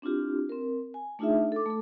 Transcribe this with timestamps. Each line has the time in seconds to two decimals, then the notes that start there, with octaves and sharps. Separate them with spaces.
0.02 C4 D4 E4 F4 G4
0.49 C4 A#4
0.94 G#5
1.19 A3 D4 D#4 F4 G#4 E5
1.52 A4 D6
1.66 A3 A4